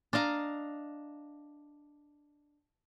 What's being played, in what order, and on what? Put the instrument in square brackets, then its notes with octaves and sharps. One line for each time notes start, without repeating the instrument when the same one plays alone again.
[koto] D4 D#5 F5 A#5